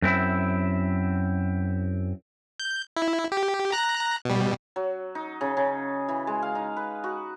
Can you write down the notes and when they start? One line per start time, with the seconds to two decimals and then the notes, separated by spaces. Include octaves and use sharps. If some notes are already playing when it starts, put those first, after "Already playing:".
0.02 F#2 C4 E4
2.60 G6
2.96 E4
3.32 G4
3.72 A#5 F#6 A#6
4.25 B2 G3
4.76 F#3
5.15 D#4
5.41 C#3
5.57 C#3
6.08 E3
6.27 G#3
6.42 F5
6.55 D#4
6.76 B4
7.04 F#4